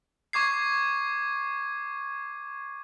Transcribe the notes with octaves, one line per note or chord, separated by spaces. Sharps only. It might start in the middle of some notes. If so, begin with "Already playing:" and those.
C#6 D6 G#6 C7